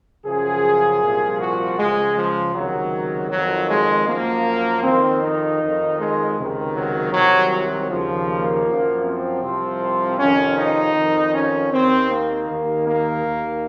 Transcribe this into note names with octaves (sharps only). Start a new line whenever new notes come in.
F#2 C#3 F3 G#4
C2 A#2 F3
F#4
C#2 C#3 F3 G#3
F3
C#2 C3 D#3 F#3
F2 D#3 F#3
G#3
F#2 F3 A#3
F2 D#3 C4
D#4
F2 D#3
G#3
C#2 C3 D#3
F#3
C2 C3 D#3 F#3
F#3
D#2 C#3 F3
A#3
F#2 F3
C4
C2 C3 F3
F2 C3 D#3 C#4
D#4
F2 D#3
C#4
D#2 D#3 C4
A#3
D#2 D#3
A#3
D#2 D#3